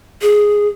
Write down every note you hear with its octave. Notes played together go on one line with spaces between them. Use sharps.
G#4